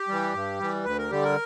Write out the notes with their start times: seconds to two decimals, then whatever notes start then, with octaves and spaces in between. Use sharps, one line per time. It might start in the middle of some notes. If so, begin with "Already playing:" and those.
Already playing: G4
0.08 E3 G3
0.34 G2
0.59 E3 G3
0.84 D2 B4
0.98 A#4
1.10 D3 G3 G4
1.24 A#4